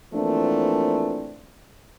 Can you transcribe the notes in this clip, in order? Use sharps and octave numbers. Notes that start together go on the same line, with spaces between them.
E3 F3 A3 A#3 C4 D4